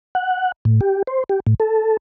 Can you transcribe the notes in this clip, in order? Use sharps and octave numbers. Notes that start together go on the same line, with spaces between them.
F#5
A2
G4
C5
G4
A2
A4